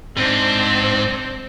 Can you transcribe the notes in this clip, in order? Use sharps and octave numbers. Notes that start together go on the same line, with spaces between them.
G#2 C4 D4 C5